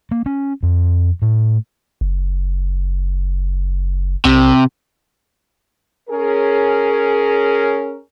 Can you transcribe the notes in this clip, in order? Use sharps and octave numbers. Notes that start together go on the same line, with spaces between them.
A#3
C#4
F2
A2
F#1
B1 C3
C#4 G#4 A#4